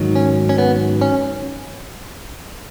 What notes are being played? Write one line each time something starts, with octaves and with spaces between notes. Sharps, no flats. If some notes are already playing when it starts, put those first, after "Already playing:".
Already playing: G#2 D#3 F#3
C#4
C#4
B3
C#4